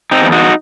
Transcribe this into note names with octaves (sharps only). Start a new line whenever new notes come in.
C4 D#4
E2
D#4 F#4